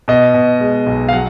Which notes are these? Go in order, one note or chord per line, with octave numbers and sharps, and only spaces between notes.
B2 D#5
B2
G#3
B1
F5
F#3 F#5